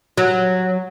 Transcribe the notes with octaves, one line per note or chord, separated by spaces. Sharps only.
F#3